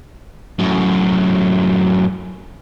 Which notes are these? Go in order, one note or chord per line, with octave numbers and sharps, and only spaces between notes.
F#2 A2